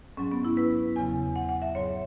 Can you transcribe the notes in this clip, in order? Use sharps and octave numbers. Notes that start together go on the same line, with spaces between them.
G#2 F#3 C#4
B3
E4
B4
E2 C#3 F#3 G#5
F#5
F#5
E5
G#2 F#3 C#5